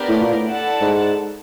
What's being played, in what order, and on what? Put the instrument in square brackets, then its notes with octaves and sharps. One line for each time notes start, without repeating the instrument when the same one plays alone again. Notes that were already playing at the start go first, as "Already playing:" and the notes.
Already playing: [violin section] B3 D4 G4 A#4 D5
[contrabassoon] A2
A#2
A2
[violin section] E4 A4 D5 F#5 A5
[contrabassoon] G#2